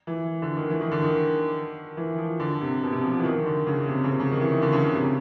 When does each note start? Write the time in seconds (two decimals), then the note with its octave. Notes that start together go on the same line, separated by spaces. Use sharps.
0.07 E3
0.42 D3
0.57 D#3
0.70 E3
0.81 D#3
0.91 D3
1.02 D#3
1.97 E3
2.18 F3
2.40 D3
2.61 C3
2.82 B2
2.92 C3
3.03 F3
3.19 E3
3.24 D#3
3.46 D3
3.67 C#3
3.88 C3
4.04 C#3
4.09 C3
4.20 C#3
4.32 D#3
4.41 E3
4.52 D#3
4.62 D3
4.72 C#3
4.84 C#3
4.94 C3
5.03 C#3